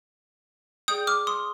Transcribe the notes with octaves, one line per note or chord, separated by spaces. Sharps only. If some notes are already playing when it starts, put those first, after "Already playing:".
G#4 D5 G5 D#6 G6
D6 F6
C6 D#6